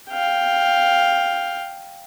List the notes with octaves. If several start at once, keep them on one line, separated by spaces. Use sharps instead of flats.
F5 G5